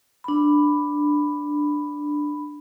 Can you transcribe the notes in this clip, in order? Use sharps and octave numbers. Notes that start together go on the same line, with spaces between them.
D4 B5